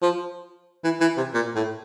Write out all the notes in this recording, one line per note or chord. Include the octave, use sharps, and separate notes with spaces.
F3
E3
E3
C3
A#2
A2